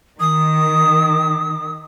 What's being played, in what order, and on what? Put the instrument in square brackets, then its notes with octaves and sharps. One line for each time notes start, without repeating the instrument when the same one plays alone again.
[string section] D#3 [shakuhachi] D#6